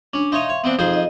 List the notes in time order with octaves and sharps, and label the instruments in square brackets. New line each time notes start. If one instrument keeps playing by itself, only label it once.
[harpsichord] C#4 [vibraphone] D4
[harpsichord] D#4 C#5 D#6 [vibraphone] E5 F5 C6
[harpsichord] C#5
B3 C4 D4
[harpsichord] F2 G#4 C5 [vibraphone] D#4
[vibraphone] D#5